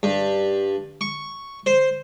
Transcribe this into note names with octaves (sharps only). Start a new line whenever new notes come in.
G2
C#6
C5